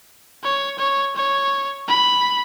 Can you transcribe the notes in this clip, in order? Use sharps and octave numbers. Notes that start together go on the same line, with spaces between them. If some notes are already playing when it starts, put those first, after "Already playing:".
C#5
C#5
C#5
B5